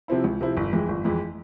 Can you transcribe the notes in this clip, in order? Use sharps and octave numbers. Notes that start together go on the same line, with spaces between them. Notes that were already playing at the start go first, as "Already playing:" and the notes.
C3 F3 C4 E4
C#2
C3 F3 C4 E4
G1
F2 E3 G#3 E4
G1
F2 E3 G#3 E4